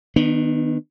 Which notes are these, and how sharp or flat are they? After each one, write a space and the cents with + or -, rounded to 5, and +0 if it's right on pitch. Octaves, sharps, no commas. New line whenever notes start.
D#3 +0 B3 +0 D4 +45